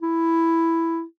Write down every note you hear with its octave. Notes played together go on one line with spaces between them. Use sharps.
E4